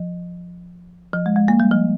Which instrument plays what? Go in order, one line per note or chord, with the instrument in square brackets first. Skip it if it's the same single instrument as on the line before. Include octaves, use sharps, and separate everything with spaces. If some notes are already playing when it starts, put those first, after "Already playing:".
Already playing: [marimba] F3
F3
G#3
G#3
A#3
G3
F3